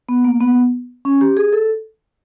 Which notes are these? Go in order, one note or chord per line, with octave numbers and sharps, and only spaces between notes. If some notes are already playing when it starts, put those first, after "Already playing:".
B3
A#3
B3
C#4
G4
G#4
A4